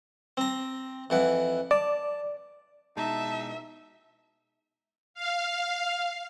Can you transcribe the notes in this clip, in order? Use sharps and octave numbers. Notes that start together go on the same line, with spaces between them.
C4 A#5
F2 E3 F#5
D5 A5
B2 G#3 D#4 E5 A5
F5